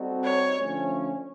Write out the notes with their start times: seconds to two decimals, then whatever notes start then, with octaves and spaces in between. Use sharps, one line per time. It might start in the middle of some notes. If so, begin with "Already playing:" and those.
Already playing: G3 C4 D#4 F#4 A4
0.24 C#5
0.57 D3 F3 A3 C#4